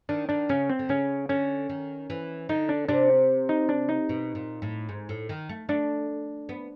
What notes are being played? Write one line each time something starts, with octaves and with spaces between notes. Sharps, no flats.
D#3 D4
D#3 D4
C#3 C#4
C4
D3
C#3 C#4
D3 C#4
D#3
E3
D3 D#4
D4
C3 D4
D#4
D4
D#4
B2
A#2
A2
G#2
A2
D#3
A3
A3 D4
B3